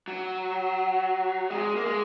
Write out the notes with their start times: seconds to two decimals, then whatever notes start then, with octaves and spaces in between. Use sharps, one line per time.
0.08 F#3
1.50 G#3
1.76 A#3
1.86 G#3